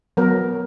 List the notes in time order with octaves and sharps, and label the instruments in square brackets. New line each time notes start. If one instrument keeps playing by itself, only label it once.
[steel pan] F#3 B3 A#4